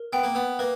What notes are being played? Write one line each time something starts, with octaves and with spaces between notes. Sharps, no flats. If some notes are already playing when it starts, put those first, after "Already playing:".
Already playing: A#4
B3 G5
A#3
B3
A#3 B4